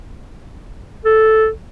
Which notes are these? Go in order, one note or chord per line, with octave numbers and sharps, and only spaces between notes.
A4